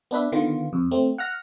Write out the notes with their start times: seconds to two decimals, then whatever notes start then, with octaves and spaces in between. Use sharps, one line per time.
0.11 B3 D4 B4 E5
0.32 D3 D#3 B3 F4
0.73 F2
0.91 A3 C4
1.18 F#5 F6 A#6